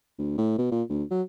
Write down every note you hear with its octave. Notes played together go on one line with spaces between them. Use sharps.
D2
A2
B2
A#2
D2
F#3